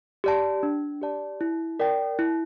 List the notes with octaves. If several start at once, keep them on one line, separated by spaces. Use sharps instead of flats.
G4 D5 A5
D4
G4 D5 A5
E4
A#4 D5 G5
E4